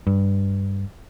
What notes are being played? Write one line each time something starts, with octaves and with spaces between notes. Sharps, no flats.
G2